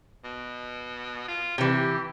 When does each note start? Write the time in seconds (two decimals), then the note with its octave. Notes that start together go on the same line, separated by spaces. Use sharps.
0.24 B2
1.28 F4
1.58 C3 E3 G4